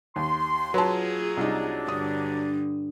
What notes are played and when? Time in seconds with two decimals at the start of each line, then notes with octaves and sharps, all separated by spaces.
0.16 D#2 C6
0.74 F#3 F4 G#4 B4 A5
1.37 C2 D4 D#4
1.88 G2 D3 D#6